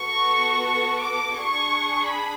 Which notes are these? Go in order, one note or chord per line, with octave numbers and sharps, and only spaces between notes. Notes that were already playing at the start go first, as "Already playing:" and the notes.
Already playing: B3 F#4 A4 C#6
C#6
D6
D4 G#4 C#6
B5